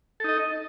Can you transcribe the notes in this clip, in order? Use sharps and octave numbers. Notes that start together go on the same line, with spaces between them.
D#4 A4 D#5